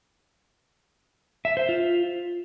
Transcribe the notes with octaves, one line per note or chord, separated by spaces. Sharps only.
E5
C5
F4